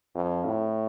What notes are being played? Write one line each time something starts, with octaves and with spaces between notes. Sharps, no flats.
F2
A2